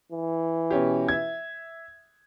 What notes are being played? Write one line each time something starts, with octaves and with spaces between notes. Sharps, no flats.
E3
B2 C#4 G4
E5 G#6